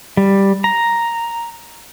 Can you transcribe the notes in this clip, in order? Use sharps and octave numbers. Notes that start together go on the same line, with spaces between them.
G3
A#5